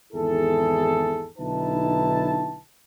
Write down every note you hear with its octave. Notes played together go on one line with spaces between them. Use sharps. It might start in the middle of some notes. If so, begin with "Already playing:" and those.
G#1 E2 E4 G#4 A4
B1 D3 D#4 E4 B4 A5